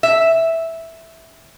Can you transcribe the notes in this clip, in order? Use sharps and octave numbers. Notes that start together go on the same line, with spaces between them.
E5